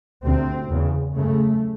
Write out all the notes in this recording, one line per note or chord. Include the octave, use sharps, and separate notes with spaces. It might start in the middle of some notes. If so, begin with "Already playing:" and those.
D2 C3 C4
E2 C#3
F#2 C#3 A3